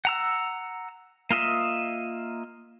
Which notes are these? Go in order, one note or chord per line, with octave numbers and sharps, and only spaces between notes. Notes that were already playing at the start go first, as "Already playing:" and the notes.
F#5 A#5 E6
A#3 F4 D#5 E5